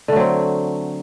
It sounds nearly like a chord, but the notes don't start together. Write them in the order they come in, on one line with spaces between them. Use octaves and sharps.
D3 A3 F#3 C4